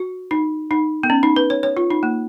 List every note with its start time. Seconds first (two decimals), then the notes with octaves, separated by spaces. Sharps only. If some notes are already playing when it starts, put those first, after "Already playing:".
Already playing: F#4
0.31 D#4
0.71 D#4
1.03 B3
1.10 C#4
1.23 D#4
1.36 B4
1.50 C#5
1.63 C#5
1.77 F4
1.91 D#4
2.03 A#3